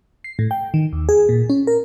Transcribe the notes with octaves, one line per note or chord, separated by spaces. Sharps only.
C7
A2
G5
D#3
D#2
G#4
A#2
C#4
A#4